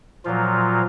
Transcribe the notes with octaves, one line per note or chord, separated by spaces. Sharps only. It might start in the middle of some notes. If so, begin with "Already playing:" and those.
A#2 F3 F#3 F4